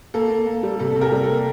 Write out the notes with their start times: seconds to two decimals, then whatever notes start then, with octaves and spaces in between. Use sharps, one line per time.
0.14 A#3 A4
0.30 A#3
0.47 A#3
0.63 G3
0.79 C3 A4
0.92 C3 A4
1.01 G4 A#4
1.12 G3
1.23 A4
1.28 A#3